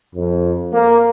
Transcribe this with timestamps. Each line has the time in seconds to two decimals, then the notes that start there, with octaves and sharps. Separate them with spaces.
0.15 F2
0.72 A#3